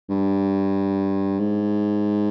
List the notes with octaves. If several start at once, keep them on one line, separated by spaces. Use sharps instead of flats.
G2
G#2